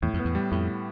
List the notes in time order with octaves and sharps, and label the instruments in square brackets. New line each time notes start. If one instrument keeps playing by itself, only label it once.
[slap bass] E2 [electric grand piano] A2
[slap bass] F2
[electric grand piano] B3
[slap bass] E2
[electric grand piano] G3
[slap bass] F2 [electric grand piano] A2